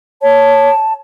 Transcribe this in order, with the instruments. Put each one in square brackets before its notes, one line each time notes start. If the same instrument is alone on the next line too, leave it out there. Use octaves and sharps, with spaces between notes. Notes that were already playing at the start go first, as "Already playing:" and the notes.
[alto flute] C#5 [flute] A5